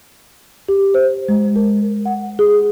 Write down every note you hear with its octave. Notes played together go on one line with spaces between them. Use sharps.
G4
C5
G#3
A#4
F#5
G#4